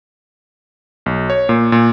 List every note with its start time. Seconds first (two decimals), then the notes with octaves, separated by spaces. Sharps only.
1.06 B1
1.30 C#5
1.49 A#2
1.72 A#2